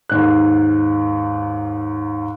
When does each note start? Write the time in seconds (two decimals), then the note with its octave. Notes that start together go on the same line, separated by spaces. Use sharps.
0.10 D#2 G#2 F#6